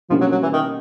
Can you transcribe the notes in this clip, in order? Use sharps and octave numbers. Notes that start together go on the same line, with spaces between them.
B2 F3 G3 A#3 C#4
F#3
F#3
E3
D#3